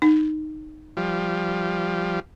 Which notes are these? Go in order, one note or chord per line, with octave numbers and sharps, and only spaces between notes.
D#4
F3 G3